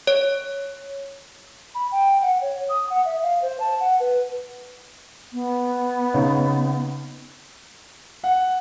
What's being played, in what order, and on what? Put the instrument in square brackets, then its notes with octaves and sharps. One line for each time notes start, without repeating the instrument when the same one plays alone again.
[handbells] C#5
[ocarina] B5
G5
F#5
C#5
D#6
F#5
E5
F5
C5
A5
F#5
B4
[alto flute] B3
[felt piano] C#3 D#4 C#5
[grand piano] F#5